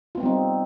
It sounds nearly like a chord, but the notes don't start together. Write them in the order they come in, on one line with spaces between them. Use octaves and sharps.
F4 B3 C4 G3 D#4